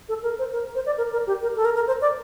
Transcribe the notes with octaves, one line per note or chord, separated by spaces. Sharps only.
A4
A#4
C5
A#4
C5
D5
A#4
A#4
G4
A#4
A4
A#4
A#4
C5
D5